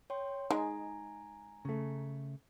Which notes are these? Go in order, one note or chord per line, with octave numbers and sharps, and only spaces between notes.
C#5 G5 C6
G#3 D#4 G#4 G#5 A#5
C#3 A3